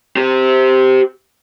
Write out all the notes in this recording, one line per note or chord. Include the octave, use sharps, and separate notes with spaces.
G4 C5